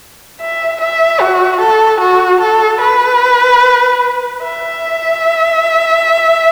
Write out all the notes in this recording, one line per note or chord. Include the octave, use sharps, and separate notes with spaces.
E5
E5
F#4
A4
F#4
A4
B4
E5